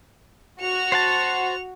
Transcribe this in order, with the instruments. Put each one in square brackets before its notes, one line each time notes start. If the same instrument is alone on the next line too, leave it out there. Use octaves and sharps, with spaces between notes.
[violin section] F#4 [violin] C#7 F7
[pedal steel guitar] C5 F#5 A5